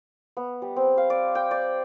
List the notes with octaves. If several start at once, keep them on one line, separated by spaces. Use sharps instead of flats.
B3
G3
C4
F5
D5
G5
D5